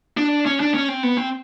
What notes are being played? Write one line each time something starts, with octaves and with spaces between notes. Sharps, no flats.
D4
C#4
D4
C#4
C4
B3
C4